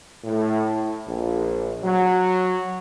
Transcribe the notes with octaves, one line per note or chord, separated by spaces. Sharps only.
A2
A#1
F#3